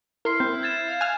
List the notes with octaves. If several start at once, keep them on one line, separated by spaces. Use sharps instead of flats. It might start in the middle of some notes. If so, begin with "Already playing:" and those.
E4 A#4 C6 F6 C7
C4 G6
G#6 A6 E7
F5
G#5 F6 F#6